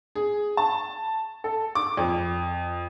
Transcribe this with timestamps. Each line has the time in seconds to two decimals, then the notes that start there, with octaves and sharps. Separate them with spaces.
0.16 G#4
0.57 A5
1.44 A4
1.75 D6
1.97 F2